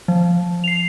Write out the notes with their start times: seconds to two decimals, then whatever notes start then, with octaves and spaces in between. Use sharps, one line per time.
0.08 F3
0.64 C7 F7